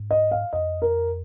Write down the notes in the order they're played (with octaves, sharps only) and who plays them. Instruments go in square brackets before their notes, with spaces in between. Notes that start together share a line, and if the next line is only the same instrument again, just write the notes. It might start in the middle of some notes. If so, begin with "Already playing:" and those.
Already playing: [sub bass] G#2
[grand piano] D#5
F5
[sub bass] F2 [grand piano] D#5
[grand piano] A#4